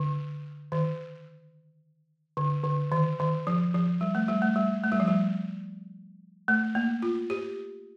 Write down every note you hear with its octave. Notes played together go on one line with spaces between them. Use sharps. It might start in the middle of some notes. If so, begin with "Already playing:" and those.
Already playing: D3
D#3
D3
D3
D#3
D#3
F3
F3
G3
A3
G3
A3
G3
A3
G3
F3
G3
A3
A#3
F4
G4